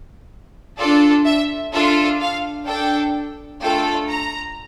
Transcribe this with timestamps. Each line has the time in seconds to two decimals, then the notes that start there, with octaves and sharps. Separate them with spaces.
0.78 D4 F4 A4 D5
1.25 E5
1.73 D4 F4 A4 E5
2.21 F5
2.67 D4 A4 G5
3.61 A3 D4 F4 A4 G5
4.09 A#5